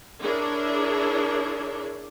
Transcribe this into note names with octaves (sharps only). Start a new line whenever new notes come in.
D4 E4 G#4 A#4 C#5